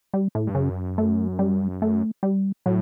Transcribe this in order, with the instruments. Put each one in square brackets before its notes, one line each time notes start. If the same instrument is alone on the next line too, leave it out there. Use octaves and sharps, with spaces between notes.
[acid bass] G3
A2
[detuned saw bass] G2
[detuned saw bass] F#2 [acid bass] C#3
[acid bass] A3
G3
A3
G3
[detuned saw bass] A2 [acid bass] F#3